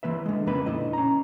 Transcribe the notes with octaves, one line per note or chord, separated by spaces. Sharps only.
E3 A#3 B4 E5
D3 G#3
F2 C#3 A#3 B4 B5
A#2 D3 E4 D#5
C#4 A#5